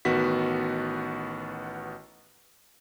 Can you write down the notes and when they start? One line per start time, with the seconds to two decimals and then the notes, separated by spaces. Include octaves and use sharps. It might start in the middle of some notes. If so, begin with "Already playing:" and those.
0.05 A1 D#3 B3 F#4 B6